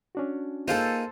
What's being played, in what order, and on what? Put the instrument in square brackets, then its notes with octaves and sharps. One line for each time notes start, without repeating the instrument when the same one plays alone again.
[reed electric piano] C#4 D4 F#4
[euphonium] A#3 [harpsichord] D#4 F4 G#4 [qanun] A4 C5